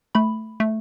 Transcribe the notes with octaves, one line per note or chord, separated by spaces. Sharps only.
A3 B5
A3